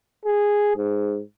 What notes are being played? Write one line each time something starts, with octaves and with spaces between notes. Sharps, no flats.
G#4
G#2